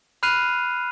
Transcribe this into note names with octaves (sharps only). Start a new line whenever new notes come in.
B5 F6 F#6 C7 D#7 F7